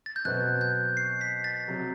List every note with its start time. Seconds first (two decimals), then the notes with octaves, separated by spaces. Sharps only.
0.06 A6
0.16 G6
0.25 B2 F#3 C4 F#4 B4 F#6
0.61 G6
0.97 C7
1.21 B6
1.44 A6
1.68 C3 F#3